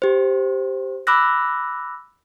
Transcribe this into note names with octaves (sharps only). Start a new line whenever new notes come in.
G4 C5
B5 D6 E6 F#6 A#6